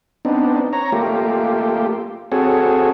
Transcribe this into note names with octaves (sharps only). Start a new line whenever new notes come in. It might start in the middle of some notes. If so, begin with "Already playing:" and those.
B3 C4 D4 D#4
C#5 A#5
A3 A#3 F4 G4
C4 F#4 G#4 A4 C#5